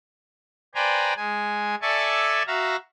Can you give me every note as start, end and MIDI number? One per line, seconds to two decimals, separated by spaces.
0.75 1.14 71
0.75 1.14 72
0.75 1.14 74
0.75 1.14 79
0.75 1.14 80
0.75 1.14 82
1.17 1.75 56
1.17 1.75 80
1.82 2.43 69
1.82 2.43 74
1.82 2.43 76
1.82 2.43 80
1.82 2.43 81
1.82 2.43 85
2.47 2.76 66
2.47 2.76 76
2.47 2.76 77
2.47 2.76 82